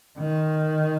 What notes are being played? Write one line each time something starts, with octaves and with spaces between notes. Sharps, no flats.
D#3